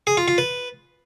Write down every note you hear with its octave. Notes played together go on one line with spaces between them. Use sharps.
G#4
F4
F4
B4